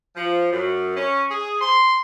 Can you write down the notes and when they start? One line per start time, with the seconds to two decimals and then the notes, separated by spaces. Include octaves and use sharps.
0.16 F3
0.52 F#2
0.97 C#4
1.30 G#4
1.61 C6